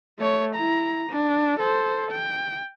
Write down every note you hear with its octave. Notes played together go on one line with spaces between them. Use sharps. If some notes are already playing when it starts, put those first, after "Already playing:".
A3 C#5
E4 A#5
D4
A4 C5
G5